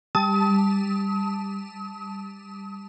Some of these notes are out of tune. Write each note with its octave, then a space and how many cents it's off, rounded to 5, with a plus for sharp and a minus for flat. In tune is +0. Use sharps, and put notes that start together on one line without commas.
G3 +15 A5 +0 D#6 +40